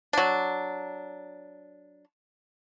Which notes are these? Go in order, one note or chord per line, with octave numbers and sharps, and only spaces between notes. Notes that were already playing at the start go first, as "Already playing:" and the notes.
F#3 D4